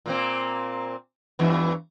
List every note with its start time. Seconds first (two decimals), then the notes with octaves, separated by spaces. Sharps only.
0.06 A#2 A#3 C4
1.39 E2 G2 E3